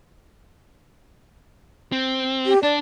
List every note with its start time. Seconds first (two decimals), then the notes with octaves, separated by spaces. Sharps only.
1.92 C4
2.46 G4
2.63 D4 D5